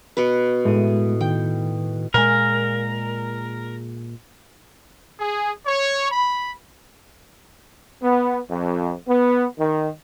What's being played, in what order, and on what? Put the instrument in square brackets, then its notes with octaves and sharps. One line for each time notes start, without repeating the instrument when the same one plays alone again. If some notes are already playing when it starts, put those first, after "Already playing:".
[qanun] B2 B4
[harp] A2 D#7 [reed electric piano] G#3
[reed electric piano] D#3 [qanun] G5
[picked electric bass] A#2 G#3 [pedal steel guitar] A#4
[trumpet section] G#4
C#5
B5
[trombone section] B3
F2
B3
D#3